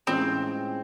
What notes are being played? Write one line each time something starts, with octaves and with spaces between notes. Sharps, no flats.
A2 E3 G#3 C4 C#4 F4